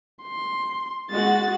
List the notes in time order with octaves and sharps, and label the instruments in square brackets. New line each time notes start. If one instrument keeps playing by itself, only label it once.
[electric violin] C6
[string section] G#3 F#4 [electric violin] A6